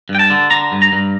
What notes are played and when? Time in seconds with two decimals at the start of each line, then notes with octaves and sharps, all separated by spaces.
0.09 G2
0.15 G5
0.19 A5
0.30 D3
0.51 D3 A#5
0.72 G2
0.82 A#5
0.93 G2